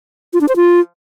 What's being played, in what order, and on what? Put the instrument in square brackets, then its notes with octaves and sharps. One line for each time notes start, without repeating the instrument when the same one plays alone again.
[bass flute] F4
D4
C5
F4